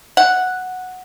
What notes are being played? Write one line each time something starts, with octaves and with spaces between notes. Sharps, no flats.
F#5